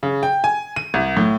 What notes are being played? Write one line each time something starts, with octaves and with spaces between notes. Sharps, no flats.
C#3
G5
G#5
D#7
C2
A2